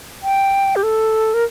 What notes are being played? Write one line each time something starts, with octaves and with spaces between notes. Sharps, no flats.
G5
G4
A4
A#4